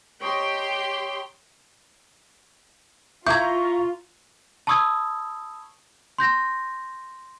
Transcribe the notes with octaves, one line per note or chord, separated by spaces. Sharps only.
G4 C#5 D#5 G5 A#5 C6
E4 F4 A#5 C#6 G6 G#6
A5 B5 C#6 D#6 E6 G#6
C6 G6 A#6